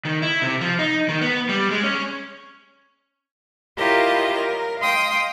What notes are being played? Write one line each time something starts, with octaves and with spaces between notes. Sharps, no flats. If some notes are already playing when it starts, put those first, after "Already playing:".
D#3
E4
C3
F3
D#4
D#3
B3
G3
G#3
C#4
E4 F4 G4 A#4 C#5 D#5
A#4
D#5 F5 G5 C6 D#6